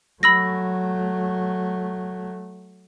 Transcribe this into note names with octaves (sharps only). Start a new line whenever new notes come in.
F#3 A3 B5 E6 A#6